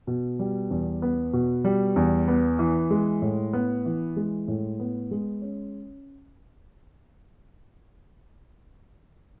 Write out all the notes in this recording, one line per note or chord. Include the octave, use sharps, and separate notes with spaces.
B2
G3
E2
B3
B2
G3
E2
B3
E3
G#3
A2
B3
E3
G#3
A2
B3
G#3
C#4